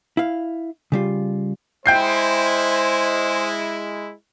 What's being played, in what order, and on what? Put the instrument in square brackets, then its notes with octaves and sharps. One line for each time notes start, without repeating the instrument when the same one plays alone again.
[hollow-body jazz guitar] E4 F5
C#3 G3 F4
[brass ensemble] G#3 E4 [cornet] C5 [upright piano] G5 G6 C7